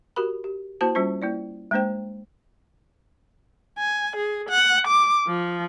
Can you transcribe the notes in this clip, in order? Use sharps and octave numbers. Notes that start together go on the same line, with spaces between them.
F#4 G4 A#4 B5
G4
A#3 E4 F#4 C5 A5
G3 C#4 F4 C5
A#3 E4 D5
G#3 A#3 D4 C5 G5
G#5
G#4
F#5
D6
F3